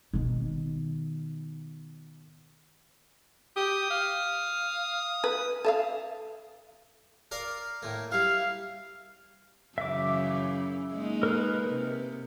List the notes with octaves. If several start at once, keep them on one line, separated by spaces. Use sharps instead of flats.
B2 D#3
G4 D#6
F5
B4
A4 E5 F5
A#4 D5 F5
A2 A#3
G3 E4 F5
F#2 C#3 E3 E5 D6
G#3 A#3 D#4
A#4 B4
C3